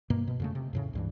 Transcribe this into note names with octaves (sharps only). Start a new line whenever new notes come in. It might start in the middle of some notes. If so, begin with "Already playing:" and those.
G2 B2 A#3
B2
F2 C#3 A3
C3
F2 A2 C#3
C#2 G2 E3